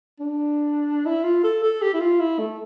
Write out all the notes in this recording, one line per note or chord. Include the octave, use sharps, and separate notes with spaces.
D4
E4
F4
A4
A4
G4
E4
F4
E4
A3